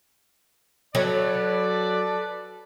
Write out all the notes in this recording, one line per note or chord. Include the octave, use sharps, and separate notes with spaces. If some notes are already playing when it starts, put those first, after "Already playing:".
F#3 A4 B4 D5